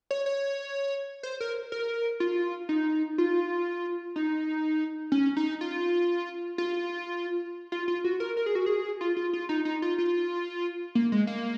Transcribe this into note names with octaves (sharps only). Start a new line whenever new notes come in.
C#5
C#5
C5
A#4
A#4
F4
D#4
F4
D#4
C#4
D#4
F4
F4
F4
F4
F#4
A#4
A#4
G#4
F#4
G#4
F4
F4
F4
D#4
D#4
F4
F4
A#3
G#3
A#3